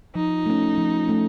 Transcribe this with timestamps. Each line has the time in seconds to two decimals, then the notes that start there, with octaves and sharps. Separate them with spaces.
0.15 F3 D#4
0.46 A3 C#4
0.77 F3
1.07 A3 C#4